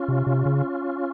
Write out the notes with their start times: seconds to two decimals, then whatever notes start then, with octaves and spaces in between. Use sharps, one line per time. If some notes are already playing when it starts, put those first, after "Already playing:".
Already playing: C#4 F4
0.08 C3
0.27 C3
0.45 C#3